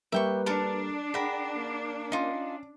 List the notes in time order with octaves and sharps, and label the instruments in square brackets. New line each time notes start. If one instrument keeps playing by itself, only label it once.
[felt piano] G3 A#3 [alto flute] B4 [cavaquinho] E5 G5 C#6
[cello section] D4 [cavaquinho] A4 A#4 A5
[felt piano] G#4 [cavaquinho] A#4 F#5 B5 [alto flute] G5
[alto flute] A#3
[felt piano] C#4 [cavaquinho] D#4 F4